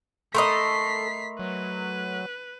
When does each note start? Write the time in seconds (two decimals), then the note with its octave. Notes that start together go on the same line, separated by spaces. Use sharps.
0.34 A3 A4 A#4 D#5 B5 C6 B6 C7
1.39 F#3 B4